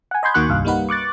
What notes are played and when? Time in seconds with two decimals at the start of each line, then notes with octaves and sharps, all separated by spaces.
0.11 F#5 G#5
0.23 D#5 G#5 B5 C6 G6 G#6
0.34 D#2 D#3 A#3 F#4 C#6 F#6
0.49 C2 G2 F5
0.65 G3 A#3 D#4 B4 F#5
0.89 C#6 D6 F#6 A6